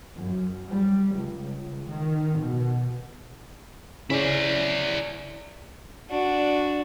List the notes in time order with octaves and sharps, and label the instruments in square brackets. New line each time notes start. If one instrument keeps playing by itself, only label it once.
[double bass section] F#2
G3
C#2
D#3
B2
[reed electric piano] C#3 C#4 [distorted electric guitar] E4 D5
[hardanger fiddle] D4 F#4